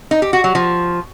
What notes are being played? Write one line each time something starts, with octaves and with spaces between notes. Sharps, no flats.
D#4
G4
F#4
F#3
F3